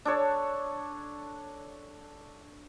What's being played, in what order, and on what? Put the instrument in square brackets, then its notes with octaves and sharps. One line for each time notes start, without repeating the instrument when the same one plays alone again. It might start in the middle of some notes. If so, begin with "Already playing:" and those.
[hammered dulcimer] D4 A4 C#5